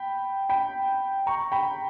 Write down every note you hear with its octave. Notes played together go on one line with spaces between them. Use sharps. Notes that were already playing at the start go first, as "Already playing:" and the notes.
Already playing: G5 B5
G5 B5
A#5 C#6
G5 B5